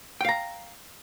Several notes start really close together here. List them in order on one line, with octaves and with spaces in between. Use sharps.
G5 F5 A#5